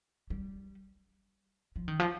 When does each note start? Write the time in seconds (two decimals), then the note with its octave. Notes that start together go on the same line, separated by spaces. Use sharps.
0.30 G3
1.76 F3
1.88 D#3
2.00 F3